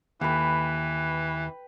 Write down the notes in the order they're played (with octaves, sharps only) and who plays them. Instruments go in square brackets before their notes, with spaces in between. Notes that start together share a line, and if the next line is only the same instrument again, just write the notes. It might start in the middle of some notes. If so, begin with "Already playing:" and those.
[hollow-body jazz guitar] D#2 [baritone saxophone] E3 [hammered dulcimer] B4 G5